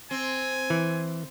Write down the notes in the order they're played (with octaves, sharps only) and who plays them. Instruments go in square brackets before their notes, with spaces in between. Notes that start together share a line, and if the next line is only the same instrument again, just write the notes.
[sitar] C4 [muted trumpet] G#5
[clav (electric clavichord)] E3